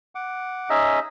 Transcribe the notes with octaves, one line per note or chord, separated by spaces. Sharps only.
F#5 D6
C#4 D#4 G#4 D#5 E5